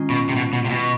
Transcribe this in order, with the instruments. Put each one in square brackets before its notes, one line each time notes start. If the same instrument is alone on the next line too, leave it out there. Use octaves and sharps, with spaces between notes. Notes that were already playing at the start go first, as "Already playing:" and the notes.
Already playing: [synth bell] D#3 G#3 C#4 F4
[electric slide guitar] B2
C3
B2
B2
C3
B2